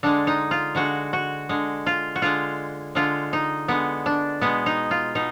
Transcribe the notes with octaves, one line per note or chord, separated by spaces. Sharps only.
D3 G#3 D4
D#4
F4
D3 G#3 F#4
F#4
D3 G#3
F4
F#4
D3 G#3 F4
D3 G#3 F4
D#4
D3 G#3 B3
D4
B2 G#3 B3
D#4
F4
B2 D#4